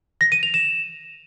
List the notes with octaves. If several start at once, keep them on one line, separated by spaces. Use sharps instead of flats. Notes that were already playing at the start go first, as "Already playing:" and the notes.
A#6
D#7
F7
E7